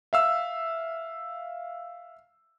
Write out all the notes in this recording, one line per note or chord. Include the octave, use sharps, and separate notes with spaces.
E5 F5 E6